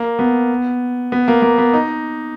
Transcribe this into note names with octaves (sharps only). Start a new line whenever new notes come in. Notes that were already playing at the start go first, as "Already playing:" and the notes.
Already playing: A#3
B3
B3
A#3
A#3
B3
D#4